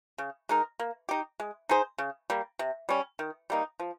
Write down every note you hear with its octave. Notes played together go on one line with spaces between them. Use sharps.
C#3
G#3 D#4 A#4
A#3
D#4 G4
G#3
D#4 G#4 C5
C#3
G3 A#3
C3
G3 C#4
D#3
G3 A#3 D#4
F3